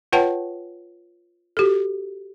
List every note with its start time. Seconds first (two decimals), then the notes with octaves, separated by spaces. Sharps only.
0.13 F4 B4 C#5 F#5 G5 A5
1.57 F#4 G4 A4